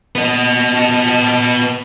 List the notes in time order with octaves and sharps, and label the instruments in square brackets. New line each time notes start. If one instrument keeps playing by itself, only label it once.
[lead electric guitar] B3 D#5